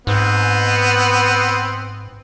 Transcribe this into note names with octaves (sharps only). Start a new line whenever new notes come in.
G#2 B3 C4